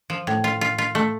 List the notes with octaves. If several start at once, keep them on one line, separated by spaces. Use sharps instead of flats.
F3
A2
F4
F4
F4
A3